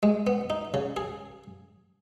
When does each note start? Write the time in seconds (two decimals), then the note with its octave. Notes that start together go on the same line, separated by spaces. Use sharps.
0.03 G#3
0.27 B3
0.50 D#4
0.74 C#3
0.97 G#4